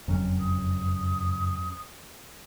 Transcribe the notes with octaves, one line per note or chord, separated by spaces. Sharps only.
F#1 F2 G#2 F#3 C#4
D#6